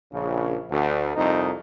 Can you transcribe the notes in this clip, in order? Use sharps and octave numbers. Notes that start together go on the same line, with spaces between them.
A#1 C#3
D2
C2 F2 D#4